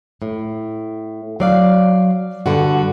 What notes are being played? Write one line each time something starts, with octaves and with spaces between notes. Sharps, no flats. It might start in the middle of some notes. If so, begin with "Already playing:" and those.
A2
F#3 D5 F5
G2 D3 F#4